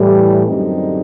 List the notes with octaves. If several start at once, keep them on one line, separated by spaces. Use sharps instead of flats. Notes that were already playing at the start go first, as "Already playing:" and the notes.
Already playing: A2 E3 G3
F#2 D3 G3 C4 D#4